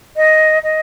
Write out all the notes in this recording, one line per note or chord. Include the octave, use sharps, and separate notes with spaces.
D#5
D#5